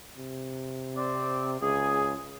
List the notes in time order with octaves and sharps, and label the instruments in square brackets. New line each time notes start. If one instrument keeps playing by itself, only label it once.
[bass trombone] C3
[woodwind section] C4 D5
[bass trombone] C#2 [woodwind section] G#4